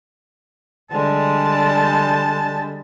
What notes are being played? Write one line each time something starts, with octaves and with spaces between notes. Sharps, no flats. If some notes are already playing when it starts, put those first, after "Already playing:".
D3 G3 G#3 A5